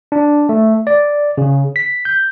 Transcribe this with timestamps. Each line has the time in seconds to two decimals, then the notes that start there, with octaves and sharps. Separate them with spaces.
0.12 D4
0.49 A3
0.87 D5
1.38 C#3
1.76 B6
2.05 G6